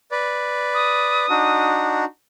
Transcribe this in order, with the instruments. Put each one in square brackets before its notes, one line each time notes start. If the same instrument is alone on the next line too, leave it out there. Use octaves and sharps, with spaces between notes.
[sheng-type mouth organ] B4 D5
[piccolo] D#6
[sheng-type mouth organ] D4 D#4 F#4